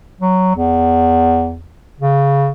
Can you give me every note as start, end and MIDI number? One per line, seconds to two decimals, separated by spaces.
0.21 0.52 54
0.55 1.67 40
2.01 2.52 49